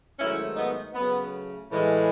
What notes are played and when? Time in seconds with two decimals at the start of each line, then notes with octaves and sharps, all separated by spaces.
0.19 G#2 D#3 F#3 A3 C#4 E4
0.57 B3 D#4
0.94 C#3 F#3 A3 B3
1.70 A2 E3 G#3